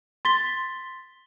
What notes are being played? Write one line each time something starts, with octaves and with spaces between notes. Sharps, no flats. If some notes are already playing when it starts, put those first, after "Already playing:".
C6 A6 B6 G7